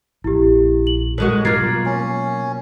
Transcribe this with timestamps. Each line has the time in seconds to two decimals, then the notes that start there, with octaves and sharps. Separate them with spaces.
0.24 A#1 E4 G4
0.87 F#7
1.18 F2 G#3 F#4 A#4
1.45 B2 F#3 A#3 F4 G#6 A6 C7
1.86 C#4